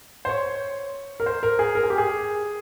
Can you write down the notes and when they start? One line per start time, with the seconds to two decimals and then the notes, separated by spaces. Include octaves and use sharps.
0.25 C5
0.29 C#5
1.20 A#4
1.26 C5
1.43 A#4
1.59 G#4
1.75 A#4
1.83 G#4
1.90 G4
1.98 G#4